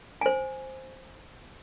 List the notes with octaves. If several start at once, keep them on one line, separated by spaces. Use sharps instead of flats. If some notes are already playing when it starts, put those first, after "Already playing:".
C5 G#5